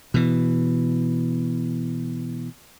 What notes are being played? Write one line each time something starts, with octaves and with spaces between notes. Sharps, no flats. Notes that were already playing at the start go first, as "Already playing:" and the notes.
B2 E3